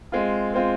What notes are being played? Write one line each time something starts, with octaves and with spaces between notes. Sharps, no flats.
G#3 C4 F4
G#3 C4 F4